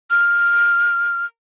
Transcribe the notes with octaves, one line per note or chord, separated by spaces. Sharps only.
F6